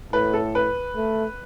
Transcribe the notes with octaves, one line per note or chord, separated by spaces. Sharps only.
A2 B4
A4
B4
A3